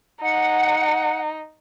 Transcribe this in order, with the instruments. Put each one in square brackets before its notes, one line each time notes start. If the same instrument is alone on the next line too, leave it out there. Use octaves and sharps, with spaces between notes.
[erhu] D#4 [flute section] F#5